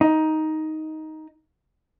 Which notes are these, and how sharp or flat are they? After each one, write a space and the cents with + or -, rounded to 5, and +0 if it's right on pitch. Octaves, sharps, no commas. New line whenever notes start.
D#4 +10